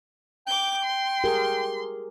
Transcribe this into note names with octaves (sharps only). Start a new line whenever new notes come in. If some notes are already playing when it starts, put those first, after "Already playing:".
G5 D6 G6
C6
G4 G#4 A#4